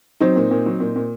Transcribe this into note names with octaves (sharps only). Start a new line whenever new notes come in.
F#3 C4 D#4
A#2
A#2
F#3
A#2
A#2